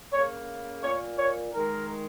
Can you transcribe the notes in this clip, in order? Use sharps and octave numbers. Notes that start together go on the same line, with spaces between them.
C#3 A#3 C#5
A#2 A#3 C#5
C#5
D#3 G#3 A#4